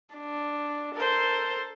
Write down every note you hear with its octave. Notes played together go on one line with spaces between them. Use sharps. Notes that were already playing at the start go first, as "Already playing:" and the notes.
D4
A4 A#4 C5